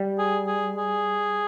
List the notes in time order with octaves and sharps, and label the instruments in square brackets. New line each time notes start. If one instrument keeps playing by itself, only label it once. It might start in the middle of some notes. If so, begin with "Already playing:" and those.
Already playing: [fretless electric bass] G3
[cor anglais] G#4
G#4
G#4